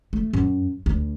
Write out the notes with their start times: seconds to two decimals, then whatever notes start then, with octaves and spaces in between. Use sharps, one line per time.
0.13 A3
0.33 F#2
0.86 D2